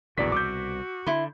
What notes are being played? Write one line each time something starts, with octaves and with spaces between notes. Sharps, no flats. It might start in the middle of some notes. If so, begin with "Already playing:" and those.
A#1 E2 A2 D3 F#4 D5 B6
C2 B2 D6 E6 G6
D3 E4 C6